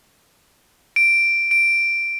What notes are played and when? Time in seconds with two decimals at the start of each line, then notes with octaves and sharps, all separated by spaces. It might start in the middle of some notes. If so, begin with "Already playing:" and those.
0.96 D7
1.51 D7